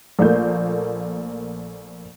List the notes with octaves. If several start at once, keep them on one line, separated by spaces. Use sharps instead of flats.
A#1 A3 A#3 G6